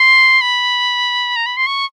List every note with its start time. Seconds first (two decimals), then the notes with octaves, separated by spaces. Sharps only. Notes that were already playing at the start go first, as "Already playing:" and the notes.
Already playing: C6
0.41 B5
1.36 A#5
1.46 B5
1.57 C6
1.67 C#6